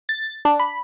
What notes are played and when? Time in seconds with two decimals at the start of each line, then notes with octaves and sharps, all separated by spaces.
0.09 A6
0.45 D4
0.59 B5